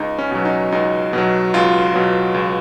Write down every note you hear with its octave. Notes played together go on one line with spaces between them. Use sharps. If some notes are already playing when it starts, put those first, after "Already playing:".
Already playing: C#2 D#4
C#4
B2 F#3
D#4
C#2 D#4
B2 F#3
C#2 F4
B2 F#3
C#2